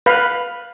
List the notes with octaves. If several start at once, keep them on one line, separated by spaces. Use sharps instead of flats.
B4 F5 B5